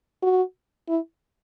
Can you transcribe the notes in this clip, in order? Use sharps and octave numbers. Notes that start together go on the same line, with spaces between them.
F#4
E4